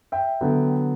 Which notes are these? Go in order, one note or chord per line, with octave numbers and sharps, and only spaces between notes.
E5 G5
D3 F#3 B3